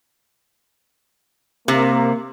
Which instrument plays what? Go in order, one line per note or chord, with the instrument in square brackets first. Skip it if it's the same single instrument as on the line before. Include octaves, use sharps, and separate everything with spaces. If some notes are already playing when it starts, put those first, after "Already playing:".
[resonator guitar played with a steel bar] C3 [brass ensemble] A#3